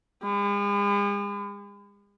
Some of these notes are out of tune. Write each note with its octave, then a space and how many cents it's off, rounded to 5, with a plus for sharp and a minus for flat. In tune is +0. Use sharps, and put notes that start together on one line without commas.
G#3 -45